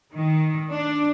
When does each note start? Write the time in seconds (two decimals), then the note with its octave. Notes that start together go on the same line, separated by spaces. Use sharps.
0.13 D#3
0.70 D4